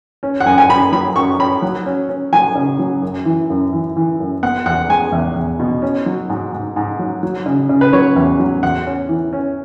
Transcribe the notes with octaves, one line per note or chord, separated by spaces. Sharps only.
C#4
F#5
F#2 G#5
G#5
F#2 B5
F#3 B5
F#2 C#6
C#4 B5
F#3
C#4
C#4
F#3 G#5
C#3
F#3
F#2
E3
F#2
E3
E3
F#2
B3 F#5
E2 F#5
G#3 G#5
E2
E2
B2
C#4
F#3
G#2
G#2
G#2
F#3
F#3
C#3
C#3
B4
F#3 C#5
E2
F#3
E2 F#5
C#4
E3
C#4